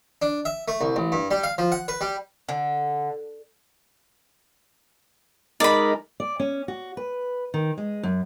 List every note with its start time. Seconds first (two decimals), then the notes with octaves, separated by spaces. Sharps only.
0.22 D4
0.45 E5
0.68 A3
0.81 C2
0.96 A1
1.12 G2
1.31 G3
1.43 F5
1.58 F3
1.72 F#5
1.88 B4
2.01 G3
2.49 D3
5.60 G#3 D#4 A#4 D5 B5
6.20 D5
6.40 C#4
6.68 F#4
6.97 B4
7.54 D#3
7.78 G#3
8.03 F#2